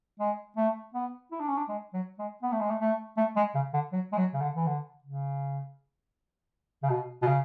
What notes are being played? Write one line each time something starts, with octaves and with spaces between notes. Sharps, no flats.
G#3
A3
B3
E4
D4
C#4
D4
G#3
F#3
G#3
B3
A3
G#3
A3
A3
A3
G#3
C#3
D3
F#3
G#3
F#3
C#3
D3
E3
D3
C#3
C#3
B2
B2
C#3